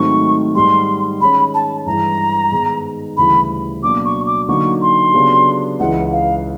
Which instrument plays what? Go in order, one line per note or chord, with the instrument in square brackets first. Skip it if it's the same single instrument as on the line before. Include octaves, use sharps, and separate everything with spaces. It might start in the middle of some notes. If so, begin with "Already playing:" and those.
Already playing: [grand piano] G#2 D#3 F#3 A3 C4 [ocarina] C#6
[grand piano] G#2 D#3 G3 [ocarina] C6
[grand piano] D#3 G#3 C#4 [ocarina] B5
[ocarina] A5
[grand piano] G2 E3 G#3 [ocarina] A#5
[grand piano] G#2 D#3 G#3 B3 D#4
[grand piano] D2 C#3 E3 G3 [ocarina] B5
[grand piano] B2 F#3 A#3 D4 [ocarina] D6
[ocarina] C#6
D6
[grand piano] D3 F#3 A#3 D#4 [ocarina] C#6
[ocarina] C6
[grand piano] C#3 F#3 B3 D4 G4
[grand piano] C#2 C#3 E3 [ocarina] F#5
[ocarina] F5